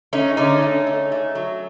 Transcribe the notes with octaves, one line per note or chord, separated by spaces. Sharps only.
A3 C#4 D#4
D3 C#4 D#4
A3
A3
A3
F#3